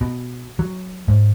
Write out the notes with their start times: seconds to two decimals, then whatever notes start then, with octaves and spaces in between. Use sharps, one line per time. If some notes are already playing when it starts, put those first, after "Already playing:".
0.01 B2
0.59 F#3
1.08 G#2